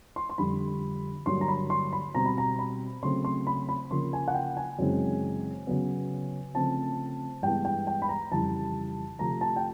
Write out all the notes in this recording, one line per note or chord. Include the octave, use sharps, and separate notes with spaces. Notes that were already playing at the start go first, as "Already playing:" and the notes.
C6
C6
F2 D3 G3 B5
G2 D3 F#3 A#3 C6
A#5
B5
C6
B5
B2 G3 C4 A#5
B5
A#5
B5
C#3 F#3 A3 C4 C6
C6
B5
B5
C#3 F3 A#3 C6
G#5
F#5
G5
G#5
F#2 C#3 E3 G#3 C4
C#3 F#3 B3
C#3 F3 A3 C4 A5
G2 E3 G#3 B3 G5
G5
G5
B5
A#5
F2 C#3 E3 G3 A5
C3 F3 A3 A#5
A5
G5